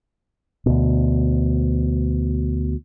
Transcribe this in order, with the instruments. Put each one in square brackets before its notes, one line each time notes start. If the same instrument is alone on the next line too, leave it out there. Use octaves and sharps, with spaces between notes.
[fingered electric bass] D2 B2